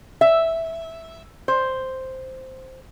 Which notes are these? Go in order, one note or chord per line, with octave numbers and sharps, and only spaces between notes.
E5
C5